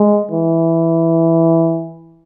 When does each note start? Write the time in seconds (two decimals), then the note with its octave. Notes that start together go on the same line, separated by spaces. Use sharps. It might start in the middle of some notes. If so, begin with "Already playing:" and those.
Already playing: G#3
0.31 E3